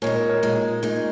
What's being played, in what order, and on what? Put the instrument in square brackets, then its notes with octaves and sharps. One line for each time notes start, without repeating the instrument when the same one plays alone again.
[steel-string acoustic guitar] A#2 G#3 D#4 [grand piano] A#4 C#5
[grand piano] A#4 C#5
A#4 C#5
[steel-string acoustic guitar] A#2 G#3 D#4
A#2 G#3 D#4